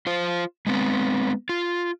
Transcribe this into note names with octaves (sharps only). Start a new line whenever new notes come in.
F4 C5
G#3 B3 C4
F4